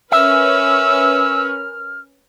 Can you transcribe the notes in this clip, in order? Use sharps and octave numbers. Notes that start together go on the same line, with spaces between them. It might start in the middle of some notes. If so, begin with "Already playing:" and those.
C#4 A#4 B4 E5 E6 F6